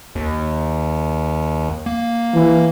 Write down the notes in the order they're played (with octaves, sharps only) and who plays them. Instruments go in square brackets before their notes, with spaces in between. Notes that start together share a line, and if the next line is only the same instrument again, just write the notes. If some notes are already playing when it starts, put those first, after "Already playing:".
[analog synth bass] D#2
A#3
[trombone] E3